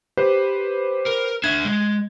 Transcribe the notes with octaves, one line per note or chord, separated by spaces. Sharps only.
G4 B4 C5
A#4
D4 E5 G#6
G#3